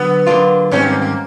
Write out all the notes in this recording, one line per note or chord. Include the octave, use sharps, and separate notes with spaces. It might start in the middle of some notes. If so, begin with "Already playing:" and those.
Already playing: D3 F#3 B3
D3 F#3 A#3 D4 F4
G#2 D#3 G3 C4 C#4
A#3
A#3